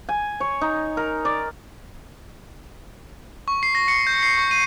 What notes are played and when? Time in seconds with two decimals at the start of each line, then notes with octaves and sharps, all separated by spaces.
0.09 G#5
0.40 C#5
0.61 D#4
0.97 A#4
1.25 D5
3.48 C#6
3.63 C7
3.75 A#6
3.88 C#7
4.07 G6
4.23 C7
4.37 C#6
4.51 D#7